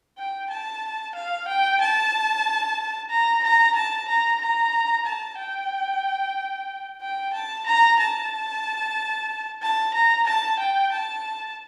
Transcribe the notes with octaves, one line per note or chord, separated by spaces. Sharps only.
G5
A5
F5
G5
A5
A#5
A#5
A5
A#5
A#5
A5
G5
G5
A5
A#5
A5
A5
A#5
A5
G5
A5